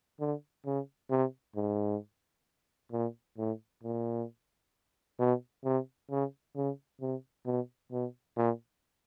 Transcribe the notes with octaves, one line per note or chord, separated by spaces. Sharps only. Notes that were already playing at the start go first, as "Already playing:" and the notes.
D3
C#3
C3
G#2
A#2
A2
A#2
B2
C3
C#3
C#3
C3
B2
B2
A#2